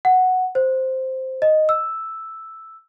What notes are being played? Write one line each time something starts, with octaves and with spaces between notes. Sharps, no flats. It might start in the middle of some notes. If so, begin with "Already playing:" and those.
F#5
C5
D#5
E6